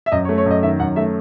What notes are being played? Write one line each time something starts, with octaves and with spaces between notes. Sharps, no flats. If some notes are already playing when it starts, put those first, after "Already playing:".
E5
F#2 D#5
C#5
A3
C#5
F#2 D#5
D#3 E5
F#2 F#5
A3 E5